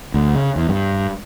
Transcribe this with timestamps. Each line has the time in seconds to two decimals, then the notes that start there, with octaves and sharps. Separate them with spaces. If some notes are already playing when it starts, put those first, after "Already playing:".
0.14 D2
0.36 C#3
0.56 E2
0.69 G2